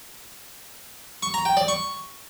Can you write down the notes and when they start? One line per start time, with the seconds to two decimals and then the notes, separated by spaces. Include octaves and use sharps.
1.23 C#6
1.34 A#5
1.45 G5
1.57 D5
1.68 C#6